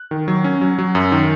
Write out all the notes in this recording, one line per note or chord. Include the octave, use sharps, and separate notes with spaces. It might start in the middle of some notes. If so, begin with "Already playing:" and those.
Already playing: F#6
D#3
F#3
C#4
F#3
F#3
F#2
D#3